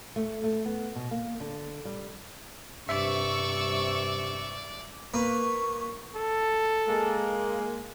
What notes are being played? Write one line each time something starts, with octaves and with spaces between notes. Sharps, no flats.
A3
A3
B3
B2
A#3
D3
G3
G2 C3 D5 E5 C#6 E6
A#3 B4 C#6
A4
G#3 A#3